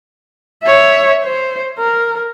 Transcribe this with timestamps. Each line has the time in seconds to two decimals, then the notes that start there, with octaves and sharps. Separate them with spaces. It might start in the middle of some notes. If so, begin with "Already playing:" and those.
0.63 C#5 E5
1.24 C5
1.79 A#4